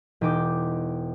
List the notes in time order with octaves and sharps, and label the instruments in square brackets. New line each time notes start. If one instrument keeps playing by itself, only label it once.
[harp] E1 D#4 G5 D6